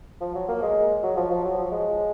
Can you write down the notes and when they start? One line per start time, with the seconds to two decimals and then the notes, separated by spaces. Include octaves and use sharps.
0.21 F3
0.35 F#3
0.49 A#3
0.62 G#3
1.03 F#3
1.17 F3
1.31 F3
1.45 F#3
1.58 F3
1.71 G#3